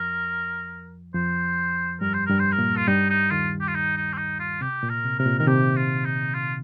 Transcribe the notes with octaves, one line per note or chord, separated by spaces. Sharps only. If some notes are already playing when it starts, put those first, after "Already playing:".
Already playing: F2 F3 A#4
F2 F3 C5
G2 G3 A#4
C5
G2 G3 A#4
C5
A#4
A#2 A#3
F4
G2 G3 D#4
D#4
D#2 D#3 F4
G4
F4
D#4
D#4
C4
D#4
F4
C3 G4
A#2
A#4
C3
C3 A#4
A#2
D#3 A#4
C3 G4
F4
D#4
F4